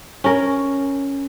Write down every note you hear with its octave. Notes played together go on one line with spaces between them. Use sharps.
C#4 A#4